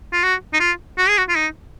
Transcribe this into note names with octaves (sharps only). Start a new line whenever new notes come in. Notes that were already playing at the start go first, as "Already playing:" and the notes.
F4
F#4
D#4
F4
F#4
G#4
F#4
F4
D#4